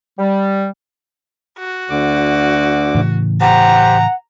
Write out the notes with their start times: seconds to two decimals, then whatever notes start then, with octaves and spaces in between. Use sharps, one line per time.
0.19 G3
1.59 F#4
1.90 D2 D3 D6
2.95 A2 C#3 E3
3.41 G4 C5 F#5 A#5